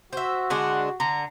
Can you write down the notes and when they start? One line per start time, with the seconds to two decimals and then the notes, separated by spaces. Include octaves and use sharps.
0.13 F#4 C5 E5
0.50 D3 G#3 D4 F#5
1.00 D3 A#5